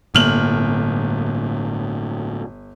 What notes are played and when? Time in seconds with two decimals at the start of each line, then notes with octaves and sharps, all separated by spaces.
0.15 G1 A2 D3 A#3 F6 F#7